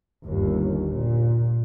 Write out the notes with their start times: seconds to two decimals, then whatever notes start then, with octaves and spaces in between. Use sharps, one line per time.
0.25 G1 D#2
0.89 A#2